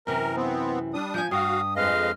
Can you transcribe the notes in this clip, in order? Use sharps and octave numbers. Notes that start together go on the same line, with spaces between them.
F#2 C3 E3 A#4
B3 C4
G3 D4 D#6
F3 G#5 G6
G2 F#4 F5 D#6
F2 G#3 B4 D#5 F5 F6